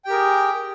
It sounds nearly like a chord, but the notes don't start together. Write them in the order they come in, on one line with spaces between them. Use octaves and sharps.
G5 G4 A#4 G#4